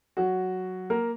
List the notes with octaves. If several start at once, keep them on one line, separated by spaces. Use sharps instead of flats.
F#3 F#4
A#3 A#4